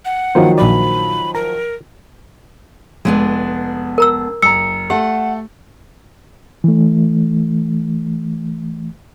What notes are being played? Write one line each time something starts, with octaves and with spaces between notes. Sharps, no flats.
F#5
D#3 F3 F#3 A#3 C5
A#1 D5 B5
A#4 A#5
F1 G#3 B3 D4
A#4 A#5 E6
F#1 A#5 E6 C#7
A3 G4 A4 F#5
E3 A3